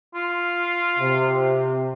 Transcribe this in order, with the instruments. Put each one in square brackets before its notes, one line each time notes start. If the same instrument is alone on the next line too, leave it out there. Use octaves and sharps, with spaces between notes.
[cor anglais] F4
[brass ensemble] C3